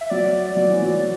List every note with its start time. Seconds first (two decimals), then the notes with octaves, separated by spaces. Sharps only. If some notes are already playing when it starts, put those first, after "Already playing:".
0.01 E5
0.10 F#3 D5
0.56 F#3
0.70 E3
0.82 F#3